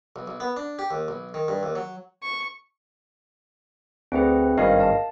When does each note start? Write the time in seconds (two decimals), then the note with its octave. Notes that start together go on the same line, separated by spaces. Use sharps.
0.16 B1
0.27 B1
0.40 B3
0.56 D4
0.79 G4
0.91 D#2
1.08 B1
1.34 D#3
1.48 G2
1.63 D#2
1.75 F#3
2.23 C#6
4.12 D2 C4 G#4 B4
4.57 G#1 G2 C#4 A#4 D#5 F5
4.80 A5